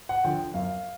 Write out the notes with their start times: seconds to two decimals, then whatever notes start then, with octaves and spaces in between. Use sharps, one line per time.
0.09 F#5
0.24 D3 F3 G5
0.54 F#2 F5